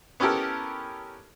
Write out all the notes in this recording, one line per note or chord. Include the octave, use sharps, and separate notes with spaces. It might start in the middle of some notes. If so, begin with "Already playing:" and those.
B3 C#4 E4 G4 A4 A#4